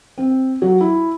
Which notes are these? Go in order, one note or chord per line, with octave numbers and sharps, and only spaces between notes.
C4
F#3
E4